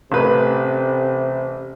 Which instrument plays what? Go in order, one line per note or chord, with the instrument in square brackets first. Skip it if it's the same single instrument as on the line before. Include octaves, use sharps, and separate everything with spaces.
[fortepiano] A1 B4 [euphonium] C3